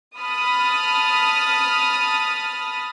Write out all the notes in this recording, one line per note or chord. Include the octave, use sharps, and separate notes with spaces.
A5 B5 D#6 F6